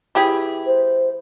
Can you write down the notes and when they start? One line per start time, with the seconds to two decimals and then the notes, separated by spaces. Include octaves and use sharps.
0.15 E3 G4 G#4
0.66 C5